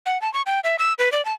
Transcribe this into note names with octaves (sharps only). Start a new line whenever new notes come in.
F#5
A5
C#6
G5
E5
E6
B4
D5
A5